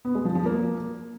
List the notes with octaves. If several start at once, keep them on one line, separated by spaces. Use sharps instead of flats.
B3
G#3
F3
F3
A#3